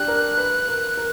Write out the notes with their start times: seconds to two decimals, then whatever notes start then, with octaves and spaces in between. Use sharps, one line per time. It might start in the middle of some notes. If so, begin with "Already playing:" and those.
Already playing: D4 G4 F#6
0.08 A#4
0.38 B4
0.68 A#4
0.97 A#4